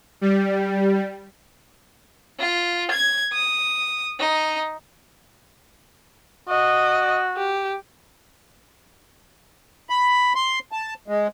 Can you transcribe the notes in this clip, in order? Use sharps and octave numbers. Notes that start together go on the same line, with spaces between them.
G3
F4
G#6
D#6
D#4
F#4 D#5
G4
B5
C6
A5
G#3